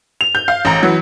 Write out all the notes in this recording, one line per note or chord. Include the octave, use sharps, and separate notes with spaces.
F7
G6
F5
A1 A#5
E3 F#3